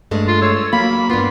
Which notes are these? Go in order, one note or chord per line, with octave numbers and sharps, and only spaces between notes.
G2 G#3 A3
F4
C#5 E6
F#3 A#3 B5
G2 B3 F4